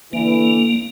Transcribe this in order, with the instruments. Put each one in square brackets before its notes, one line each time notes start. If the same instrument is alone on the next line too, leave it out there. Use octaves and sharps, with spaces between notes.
[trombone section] D3 E3 [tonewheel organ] A#3